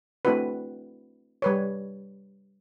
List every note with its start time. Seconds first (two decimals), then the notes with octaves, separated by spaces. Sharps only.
0.25 A3 C4 D4 E4 F#4 B4
1.42 G3 B4 C#5